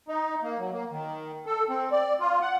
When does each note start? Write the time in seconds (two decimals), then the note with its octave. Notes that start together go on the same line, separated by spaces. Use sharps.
0.08 D#4
0.43 A#3
0.59 F#3
0.73 A#3
0.91 D#3
1.46 A4
1.69 C4
1.92 D5
2.20 F4
2.42 F#5